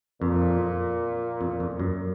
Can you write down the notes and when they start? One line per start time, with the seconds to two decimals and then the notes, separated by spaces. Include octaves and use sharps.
0.21 F2 A#2
1.41 F2
1.60 F2
1.79 F#2